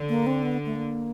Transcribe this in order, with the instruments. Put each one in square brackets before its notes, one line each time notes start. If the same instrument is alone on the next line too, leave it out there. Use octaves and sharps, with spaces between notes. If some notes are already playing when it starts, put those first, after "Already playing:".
Already playing: [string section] D3
[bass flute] A#3
C4
B3
A3
A#3